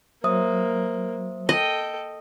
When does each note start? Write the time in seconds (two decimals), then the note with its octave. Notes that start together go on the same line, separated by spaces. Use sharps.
0.24 F#3 A#3 C5 E5 D#6
1.49 A4 D#5 G5